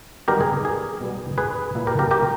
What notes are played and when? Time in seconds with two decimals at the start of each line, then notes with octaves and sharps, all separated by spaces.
0.28 D#3 G3 B3 D#4 G4 A#4
0.41 G#4
0.65 G#4
1.01 B2 G3 B3
1.38 G#4 B4
1.75 A#2 A#3 E4
1.87 G4 A#4
1.99 G4 A#4
2.11 G4 A#4